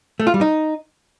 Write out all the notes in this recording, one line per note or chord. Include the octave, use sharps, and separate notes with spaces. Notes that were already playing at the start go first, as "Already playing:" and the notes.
A3
F4
G3
D#4